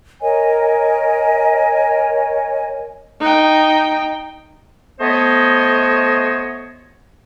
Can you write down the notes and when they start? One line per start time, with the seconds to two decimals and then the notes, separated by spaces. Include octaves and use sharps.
0.21 A#4 C#5 D#5 G#5
3.21 D#4 G5
5.00 A3 B3 C5 C#5 D#5